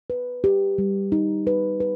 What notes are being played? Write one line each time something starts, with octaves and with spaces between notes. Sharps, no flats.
B4
G4
G3
D#4
B4
B4